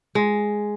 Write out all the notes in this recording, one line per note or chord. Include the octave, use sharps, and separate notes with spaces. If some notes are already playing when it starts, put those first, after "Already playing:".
G#3